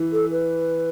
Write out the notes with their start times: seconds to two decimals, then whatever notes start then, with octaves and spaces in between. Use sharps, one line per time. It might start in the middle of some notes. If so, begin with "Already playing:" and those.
Already playing: E3
0.12 A4
0.31 B4